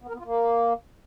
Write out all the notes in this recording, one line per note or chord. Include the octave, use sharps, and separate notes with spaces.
B3
A#4
B3
F4
A#3